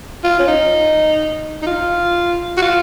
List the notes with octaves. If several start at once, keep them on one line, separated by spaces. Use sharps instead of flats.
F4
C#4
D#4
D#4
F4
F#4
F4